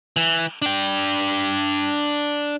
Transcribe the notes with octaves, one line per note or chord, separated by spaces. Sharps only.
E3
D4 G5